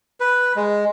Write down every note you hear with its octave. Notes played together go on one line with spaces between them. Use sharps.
B4
G#3